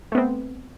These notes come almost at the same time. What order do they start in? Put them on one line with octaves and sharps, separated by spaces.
A3 B3 C4